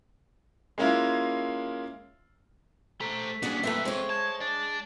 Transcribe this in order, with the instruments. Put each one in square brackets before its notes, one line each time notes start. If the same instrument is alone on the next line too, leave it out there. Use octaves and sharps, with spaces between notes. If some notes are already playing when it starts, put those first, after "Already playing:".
[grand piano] G#3 A#3 C#4 E4 F4
[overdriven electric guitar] A3 A4 [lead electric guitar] C5 A#5 [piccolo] B6
[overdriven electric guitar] A#2 G3 [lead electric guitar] C#4 D4 [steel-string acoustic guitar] F#4 G#4 D5
[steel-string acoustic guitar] A3 B4 E5 [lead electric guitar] C4 A4
[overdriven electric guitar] G#3 [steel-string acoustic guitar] C5 C#5
[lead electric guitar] A5 [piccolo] G#6
[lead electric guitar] D5 A5 [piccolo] A6